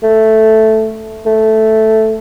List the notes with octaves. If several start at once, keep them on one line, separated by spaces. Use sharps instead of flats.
A3
A3